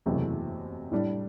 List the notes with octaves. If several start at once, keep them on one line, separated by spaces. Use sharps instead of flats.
F#1 E2 C3 F#3 A3
A2 G3 D4